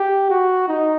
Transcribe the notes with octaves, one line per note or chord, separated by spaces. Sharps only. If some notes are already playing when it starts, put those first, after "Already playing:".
Already playing: G4
F#4
D#4